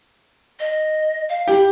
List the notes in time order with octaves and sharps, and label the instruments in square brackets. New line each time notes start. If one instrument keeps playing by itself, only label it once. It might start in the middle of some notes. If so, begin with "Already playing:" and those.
[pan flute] D#5
F5
[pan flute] E4 [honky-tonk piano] G4